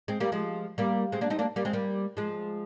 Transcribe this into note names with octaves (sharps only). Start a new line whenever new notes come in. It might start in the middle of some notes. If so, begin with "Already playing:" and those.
G#3 C4
G3 A#3
F3 G#3
G3 A#3
G#3 C4
A#3 D4
C4 D#4
A#3 D4
G3 A#3
G#3 C4
G3 A#3
F3 G#3